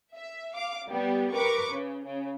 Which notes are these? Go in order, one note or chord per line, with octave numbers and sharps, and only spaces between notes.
E5
F5 D6
G3 B3
A#4 B4 C#6 D6
C#3
C#3